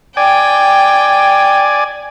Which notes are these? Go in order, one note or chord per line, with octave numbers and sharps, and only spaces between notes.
D5 G5 G#5